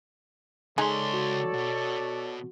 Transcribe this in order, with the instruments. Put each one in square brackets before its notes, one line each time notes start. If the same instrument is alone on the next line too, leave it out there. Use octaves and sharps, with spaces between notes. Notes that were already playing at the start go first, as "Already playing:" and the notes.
[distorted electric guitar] C#2 C6 [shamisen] G#3 D#4 G#4 [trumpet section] A4 C#5 D5
[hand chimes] F#4
[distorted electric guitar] B2